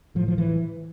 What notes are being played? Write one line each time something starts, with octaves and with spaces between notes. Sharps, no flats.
A2 F3
F3
E3